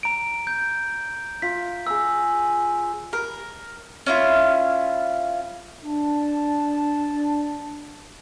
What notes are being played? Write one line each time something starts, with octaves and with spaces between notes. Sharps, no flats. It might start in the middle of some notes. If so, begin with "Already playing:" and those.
A#5 D7
G6
F4 B6
G#4 A#5 E6
A#4
C#4 E4 F4
D4 A5